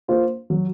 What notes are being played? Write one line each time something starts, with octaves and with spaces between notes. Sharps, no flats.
A#3 F4 C5
F#3